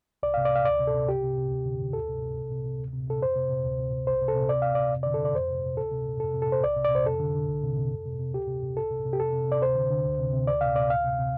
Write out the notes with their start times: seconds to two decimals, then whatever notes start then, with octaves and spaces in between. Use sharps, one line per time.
0.23 C2 D5
0.34 C3 F5
0.45 D5
0.52 C3 F5
0.65 D2 D5
0.80 C3
0.87 A4
0.94 C3
1.08 C2 G4
1.23 C3
1.38 C3
1.51 D2
1.65 D3
1.80 D3
1.93 D2 A4
2.08 C3
2.22 C3
2.36 C2
2.51 C3
2.65 C3
2.79 D2
2.93 C3
3.08 C3 A4
3.22 F2 C5
3.36 C3
3.50 C3
3.64 D2
3.79 C3
3.92 C3
4.07 C2 C5
4.21 C3
4.28 A4
4.35 C3
4.49 D2 D5
4.62 C3 F5
4.75 C3 D5
4.93 F2
5.03 D3 D5
5.14 A4
5.21 D3 D5
5.35 F2 C5
5.50 C3
5.64 C3
5.77 D2 A4
5.92 C3
6.06 C3
6.20 F2 A4
6.34 C3
6.42 A4
6.49 C3 C5
6.64 C2 D5
6.77 C3
6.85 D5
6.91 C3 C5
7.05 F2 A4
7.20 D3
7.35 D3
7.48 C2
7.63 C3
7.77 C3
7.91 F2
8.06 C3
8.19 C3
8.34 D2 G4
8.48 C3
8.63 C3
8.77 C2 A4
8.91 C3
9.05 C3
9.13 G4
9.20 F2 A4
9.33 C3
9.48 C3 D5
9.62 D2 C5
9.75 D3
9.90 D3
10.05 D2
10.19 C3
10.33 C3
10.47 D2 D5
10.61 C3 F5
10.76 C3 D5
10.89 D2 F5
11.04 C3
11.19 C3